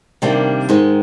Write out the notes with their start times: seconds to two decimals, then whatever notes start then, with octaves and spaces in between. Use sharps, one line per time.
0.22 C3 D#3 G3 A#3 D4
0.69 G#2 D#3 G#3